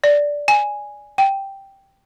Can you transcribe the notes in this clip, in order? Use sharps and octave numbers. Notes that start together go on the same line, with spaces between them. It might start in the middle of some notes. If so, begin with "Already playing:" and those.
D5
G#5
G5